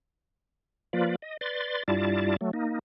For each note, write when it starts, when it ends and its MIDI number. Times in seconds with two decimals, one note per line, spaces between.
0.93 1.16 53
0.93 1.16 58
0.93 1.16 65
0.93 1.16 71
0.93 1.16 74
1.22 1.37 75
1.41 1.83 71
1.41 1.83 74
1.41 1.83 84
1.41 1.83 93
1.88 2.36 43
1.88 2.36 55
1.88 2.36 64
1.88 2.36 65
1.88 2.36 74
1.88 2.36 81
2.41 2.51 54
2.41 2.51 57
2.53 2.79 58
2.53 2.79 63